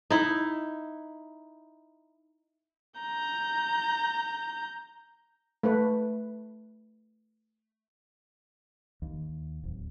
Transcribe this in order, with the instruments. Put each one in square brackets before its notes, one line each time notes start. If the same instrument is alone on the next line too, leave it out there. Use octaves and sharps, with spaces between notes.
[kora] D#4 E4
[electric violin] A#5 G6
[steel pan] A3 B4
[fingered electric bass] D#2
D1